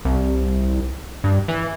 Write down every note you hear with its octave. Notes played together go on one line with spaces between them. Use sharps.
C2
G2
E3